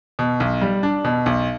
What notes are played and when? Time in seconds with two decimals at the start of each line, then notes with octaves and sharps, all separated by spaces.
0.19 B2
0.40 B1
0.61 G3
0.83 D4
1.04 B2
1.26 B1